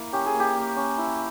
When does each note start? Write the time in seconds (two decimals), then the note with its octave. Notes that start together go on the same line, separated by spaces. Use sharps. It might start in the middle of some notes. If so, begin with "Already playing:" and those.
Already playing: A#3 E4
0.13 C#4 G4
0.26 G#4
0.34 A#3
0.40 G4
0.55 A#3
0.77 C#4
0.98 E4